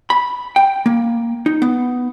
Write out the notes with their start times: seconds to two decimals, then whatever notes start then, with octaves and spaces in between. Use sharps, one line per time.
0.10 B5
0.56 G5
0.86 A#3
1.46 D#4
1.62 B3